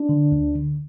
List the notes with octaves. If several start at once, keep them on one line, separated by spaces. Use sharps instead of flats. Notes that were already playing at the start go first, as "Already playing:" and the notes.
Already playing: D4
D3
D2
D3